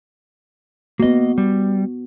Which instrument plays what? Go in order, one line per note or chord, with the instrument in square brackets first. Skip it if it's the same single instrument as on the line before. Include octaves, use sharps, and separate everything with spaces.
[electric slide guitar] A#3 D#5 [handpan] B3 F#4
[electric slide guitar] G3